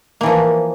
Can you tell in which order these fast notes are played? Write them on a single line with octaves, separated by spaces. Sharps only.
A#3 E3 F3